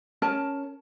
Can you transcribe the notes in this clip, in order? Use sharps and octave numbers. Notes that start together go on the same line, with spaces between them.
C#4 A#4 A5